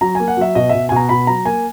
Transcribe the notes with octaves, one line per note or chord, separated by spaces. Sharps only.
F#3 A#5
A#3 G#5
F#5
F#3 E5
B2 D#5
B2 E5
G#5
B2 A#5
B2 B5
F#3 A#5
A#3 G#5